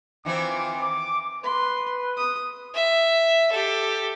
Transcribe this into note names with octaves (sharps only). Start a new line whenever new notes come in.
D#3 E3 C4 F4 D6
D6
B4 C6
D#6
E5
G4 A4